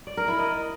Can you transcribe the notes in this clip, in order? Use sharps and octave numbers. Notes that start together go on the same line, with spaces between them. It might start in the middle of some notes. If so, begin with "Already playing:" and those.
D5
A#4
E4
D#5